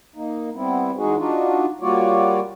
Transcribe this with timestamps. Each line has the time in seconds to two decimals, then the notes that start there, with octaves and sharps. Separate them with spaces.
0.16 A#3 D#4
0.55 G3 B3 C4 E4
0.97 E2 G#3 D#4 F#4 G#4
1.17 D4 D#4 F4 F#4
1.81 G3 A#3 F4 F#4 C#5 D5